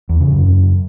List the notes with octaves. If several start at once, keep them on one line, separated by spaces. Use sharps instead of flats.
E2
C#3
F#2